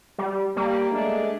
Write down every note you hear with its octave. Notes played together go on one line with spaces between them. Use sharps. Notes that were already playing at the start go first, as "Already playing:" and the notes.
G3
G3 A#3
G#3 A3 D4